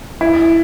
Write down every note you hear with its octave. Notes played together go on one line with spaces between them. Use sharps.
E4